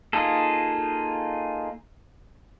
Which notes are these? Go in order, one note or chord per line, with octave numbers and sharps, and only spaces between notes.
A#3 D#4 F4 G#4 A4